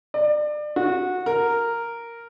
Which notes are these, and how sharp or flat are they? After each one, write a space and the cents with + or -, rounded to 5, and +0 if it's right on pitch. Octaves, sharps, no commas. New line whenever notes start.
D5 +30
F#4 -20
A#4 -5